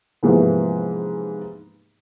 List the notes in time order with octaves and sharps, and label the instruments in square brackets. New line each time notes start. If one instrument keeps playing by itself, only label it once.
[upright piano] G#2 C3 E3 F3 A#3 B3